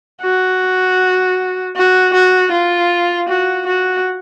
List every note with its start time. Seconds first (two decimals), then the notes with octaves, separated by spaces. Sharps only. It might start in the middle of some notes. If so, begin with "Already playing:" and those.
0.23 F#4
1.76 F#4
2.14 F#4
2.52 F4
3.29 F#4
3.66 F#4